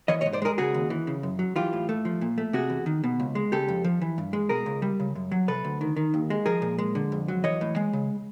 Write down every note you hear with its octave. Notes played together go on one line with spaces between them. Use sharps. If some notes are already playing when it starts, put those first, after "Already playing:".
E3 C#5 D#5
C#5 D#5
G#2
C5 D5
G#3 G#4 A#4
C#3 F#4 G#4
D#2
E3
C#3
F#2
F#3
E3 F4 G4
A2
A3
F3
A#2
A3
C3 F#4 G#4
E2
D#3
B2
C#2
G#3
C#3 G4 A4
F2
F3
E3
G2
G#3
B2 G#4 A#4
C#2
G3
C#3
F#2
F#3
C3 A4 B4
D2
D#3
D#3
D#2
G#3
F3 G#4 A#4
A#2
G#3
D3
F2
F#3
E3 C#5 D#5
A2
G#3
C#3